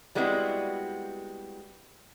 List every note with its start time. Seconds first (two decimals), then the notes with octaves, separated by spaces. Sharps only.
0.15 G3 G#3 B3 C4 E4 F#4